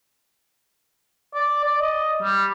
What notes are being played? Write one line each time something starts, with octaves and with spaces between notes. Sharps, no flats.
D5
D5
D#5
G3